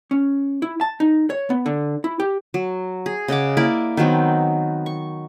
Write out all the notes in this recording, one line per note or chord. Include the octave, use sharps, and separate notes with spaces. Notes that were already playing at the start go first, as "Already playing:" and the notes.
C#4
E4
A5
D#4
C#5
B3
D3
E4
G4
F#3
G#4
C#3 D#5 F#5 D6
A#3 E4 D5
D#3 F#3 B3 C4
C#6